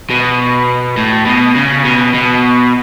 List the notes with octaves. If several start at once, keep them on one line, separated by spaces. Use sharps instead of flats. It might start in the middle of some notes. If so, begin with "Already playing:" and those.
B2
A2
B2
C#3
B2
B2